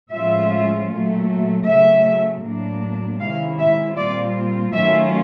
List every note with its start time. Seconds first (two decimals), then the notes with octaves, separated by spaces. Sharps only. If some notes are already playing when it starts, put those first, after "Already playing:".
0.13 A2 F3 G#3 C#4 F4 E5
0.90 A#2 F#3 A3
1.66 C#3 F#3 A3 E5
2.43 A2 F#3 A#3 D4
3.19 C3 D#3 G#3 C#4 E4 F5
3.58 E5
3.96 A#2 G3 C4 F4 D5
4.73 D#3 F#3 A3 C#4 F4 E5